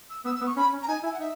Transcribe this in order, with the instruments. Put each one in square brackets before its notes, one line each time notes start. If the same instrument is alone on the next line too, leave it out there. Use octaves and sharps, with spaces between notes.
[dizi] E6
[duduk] B3 [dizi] E6
[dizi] E6
[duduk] B3
[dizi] C#6
[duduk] C#4 [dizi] B5
[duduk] C#4
[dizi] A#5
[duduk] D#4 [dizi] G#5
[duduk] E4 [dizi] G#5
[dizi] F#5
[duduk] D#4 [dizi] E5